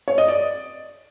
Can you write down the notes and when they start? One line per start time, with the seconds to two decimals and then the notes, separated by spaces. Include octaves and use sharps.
0.08 C#5
0.18 D#5
0.28 D5